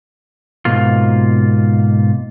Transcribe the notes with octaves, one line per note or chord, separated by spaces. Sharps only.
G#2 B2 A#3 F4